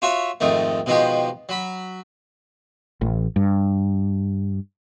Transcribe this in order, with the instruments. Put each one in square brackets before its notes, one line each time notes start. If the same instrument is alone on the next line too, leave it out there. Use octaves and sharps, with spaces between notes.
[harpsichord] F4 F#4 C#5 E5
F2 G#2 D#3 A3
B2 D#3 F3 G#3 F4 G4
F#3 B5
[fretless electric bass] A1
G2